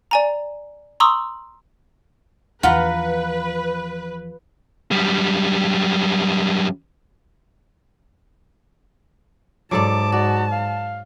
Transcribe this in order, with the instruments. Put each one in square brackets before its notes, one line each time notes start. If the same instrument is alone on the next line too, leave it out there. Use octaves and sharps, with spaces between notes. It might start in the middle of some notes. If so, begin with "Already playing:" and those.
[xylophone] D5 G#5 A#5
A#5 C6 C#6 D#6 E6 F#7
[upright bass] E2 F3 [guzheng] F4 [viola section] B4 [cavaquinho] F#5 A#5 B5
[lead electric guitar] F#2 G3
[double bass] G#2 [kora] F#3 A4 D5 [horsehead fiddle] A5 [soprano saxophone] D6
[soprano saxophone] F#4 [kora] D5
[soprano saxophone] F5